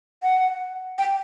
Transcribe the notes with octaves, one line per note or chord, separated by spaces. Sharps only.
F#5
G5